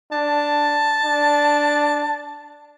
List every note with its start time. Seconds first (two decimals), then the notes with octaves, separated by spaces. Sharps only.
0.12 D4 A5
1.04 D4